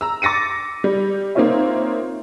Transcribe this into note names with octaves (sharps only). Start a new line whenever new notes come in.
A#5 E6
D6 A6 A#6 C#7 D#7
G3
A#3 C4 D#4 F4 C#5 E5